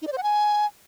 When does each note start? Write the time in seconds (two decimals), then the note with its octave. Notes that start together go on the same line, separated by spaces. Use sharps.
0.02 D#4
0.07 D5
0.12 C5
0.18 F#5
0.23 G#5